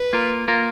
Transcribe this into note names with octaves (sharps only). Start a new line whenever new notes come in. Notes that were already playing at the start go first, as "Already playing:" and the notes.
Already playing: B4
A#3 F4 A#4
A#3 F4 A#4